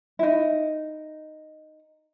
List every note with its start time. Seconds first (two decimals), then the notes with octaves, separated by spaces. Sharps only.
0.19 E4
0.23 D#4